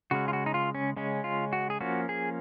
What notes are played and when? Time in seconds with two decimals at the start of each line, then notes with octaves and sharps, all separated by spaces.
0.11 C#3 G#3 C#4 F#4
0.28 F4
0.33 F#4
0.46 D#4
0.54 F4
0.75 C#4
0.97 C#3 G#3 C#4
1.24 F4
1.53 F#4
1.70 G#4
1.81 F3 A#3 C#4 F#4
2.09 G#4